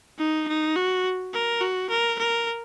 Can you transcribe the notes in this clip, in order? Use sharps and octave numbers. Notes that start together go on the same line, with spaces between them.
D#4
D#4
F#4
A#4
F#4
A#4
A#4